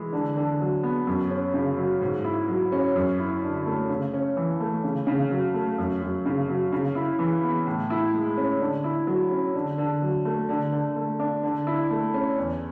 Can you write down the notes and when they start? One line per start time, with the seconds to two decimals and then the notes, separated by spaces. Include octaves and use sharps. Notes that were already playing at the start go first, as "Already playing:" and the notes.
Already playing: E3 G#3
0.13 D3
0.36 D3
0.60 F#3
0.83 B3
1.07 F#2
1.31 C#4
1.54 C#3
1.78 F#3
2.01 G#2
2.24 E4
2.48 F#3
2.72 C#4
2.96 F#2
3.19 E4
3.43 D3
3.66 A3
3.90 C#3
4.14 C#4
4.37 E3
4.60 A3
4.84 C#3
5.07 C#3
5.31 F#3
5.54 A3
5.78 F#2
6.02 F#2
6.26 C#3
6.49 F#3
6.72 C#3
6.95 E4
7.19 E3
7.43 B3
7.67 A2
7.90 E4
8.14 G#3
8.37 C#4
8.60 D3
8.84 E4
9.07 F#3
9.31 C#4
9.54 D3
9.78 D3
10.02 F#3
10.25 A3
10.49 D3
10.72 D3
10.96 A3
11.20 D4
11.43 D3
11.67 E4
11.90 A3
12.14 C#4
12.38 E2